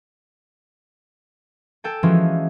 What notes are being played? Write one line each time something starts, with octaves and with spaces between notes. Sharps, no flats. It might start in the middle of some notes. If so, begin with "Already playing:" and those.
A4 G5 G#5
E3 F3 G#3 C#4 F4 F#4